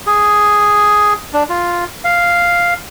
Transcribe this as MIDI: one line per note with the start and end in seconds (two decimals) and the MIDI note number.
0.07 1.14 68
1.33 1.43 62
1.49 1.85 65
2.04 2.74 77